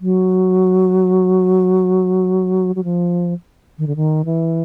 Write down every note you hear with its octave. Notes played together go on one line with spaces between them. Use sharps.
F#3
F#3
F3
D#3
D3
D#3
E3